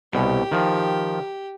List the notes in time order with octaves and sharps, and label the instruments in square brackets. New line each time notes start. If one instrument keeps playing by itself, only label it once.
[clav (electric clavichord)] C2 B2 [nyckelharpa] G4
[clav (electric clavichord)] D#3 F3